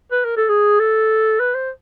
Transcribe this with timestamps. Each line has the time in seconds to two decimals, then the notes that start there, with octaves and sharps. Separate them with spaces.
0.11 B4
0.24 A#4
0.37 A4
0.49 G#4
0.79 A4
1.39 B4
1.54 C5